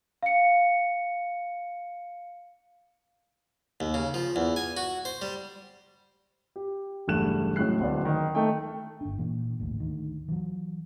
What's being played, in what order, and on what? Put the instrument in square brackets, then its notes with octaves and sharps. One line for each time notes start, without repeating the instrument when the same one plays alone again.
[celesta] F5 C#7
[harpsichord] D#2
C#3
F3
E2
G#5
F#4
C5
G3
[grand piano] G4
F#1 E2 G2 A3 F#6 E7
F#2 A2 G#3 E4 F#6 C7
D1 B3 D4
D#3
A3 D#4 G5
[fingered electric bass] G1 D4
A#2 E3
G#1 D2 A2
D2 D#3
E3 F#3